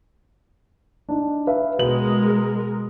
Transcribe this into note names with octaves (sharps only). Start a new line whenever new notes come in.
D4 D#4
B4 E5 F5
B2 G#3 A#4 B4 F#7